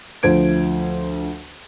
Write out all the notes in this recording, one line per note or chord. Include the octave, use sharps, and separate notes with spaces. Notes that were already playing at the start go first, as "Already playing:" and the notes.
D2 F3 C5 G#6 D7